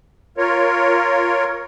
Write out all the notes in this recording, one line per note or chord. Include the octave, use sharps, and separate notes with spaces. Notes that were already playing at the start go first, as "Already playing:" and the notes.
F4 A#4 C#5